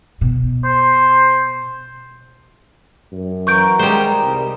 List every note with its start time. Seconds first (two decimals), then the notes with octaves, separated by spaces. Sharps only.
0.21 B2
0.65 C5
3.12 F#2
3.47 E3 F#3 A#3 C#6 G6 D7
3.79 G3 G#3 A#3 D#4 G#4 C5
4.22 C2